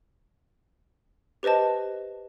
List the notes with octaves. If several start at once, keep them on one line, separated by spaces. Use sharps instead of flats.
G4 B4 C5 D#5 A5